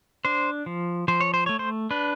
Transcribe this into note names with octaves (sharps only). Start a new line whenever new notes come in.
D4 C5
F3
F3 C5
C#5
C5
A3 C#5
C5
D4 B4